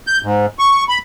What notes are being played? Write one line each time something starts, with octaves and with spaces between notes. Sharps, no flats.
G6
G#2
C#6
B5